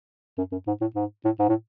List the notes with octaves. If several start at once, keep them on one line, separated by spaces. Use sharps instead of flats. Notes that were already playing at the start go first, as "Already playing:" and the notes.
F#2
F#2
G#2
A2
G#2
A2
G#2
A2